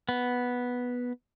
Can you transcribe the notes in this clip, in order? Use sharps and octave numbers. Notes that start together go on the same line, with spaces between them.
B3